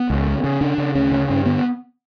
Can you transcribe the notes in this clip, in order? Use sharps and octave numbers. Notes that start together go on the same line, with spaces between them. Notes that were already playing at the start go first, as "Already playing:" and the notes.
Already playing: B3
C#2
C#3
C#3
C#3 D4
C#3
D2 C#4
C#3
G2 C#4
D3 B3